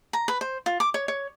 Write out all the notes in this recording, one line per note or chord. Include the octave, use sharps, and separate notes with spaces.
A#5
B4
C5
F4
D6
C#5
C#5